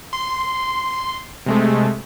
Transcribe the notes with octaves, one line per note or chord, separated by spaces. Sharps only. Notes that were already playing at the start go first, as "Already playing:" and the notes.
C6
C3 G#3 A3